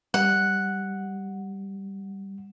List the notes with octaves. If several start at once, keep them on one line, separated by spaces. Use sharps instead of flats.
G3 F#5